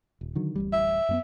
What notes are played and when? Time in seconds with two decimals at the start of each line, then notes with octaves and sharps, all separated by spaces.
0.21 D#1
0.35 D3 D#3 F#3
0.56 D1 A1 G3
0.73 E5
1.09 F#2 A#3 B3